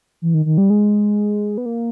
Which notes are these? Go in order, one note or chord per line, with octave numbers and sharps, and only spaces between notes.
E3
D#3
D#3
G3
G#3
B3
A#3